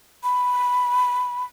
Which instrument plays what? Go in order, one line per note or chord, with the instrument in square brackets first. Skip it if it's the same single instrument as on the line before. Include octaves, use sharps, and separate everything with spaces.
[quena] B5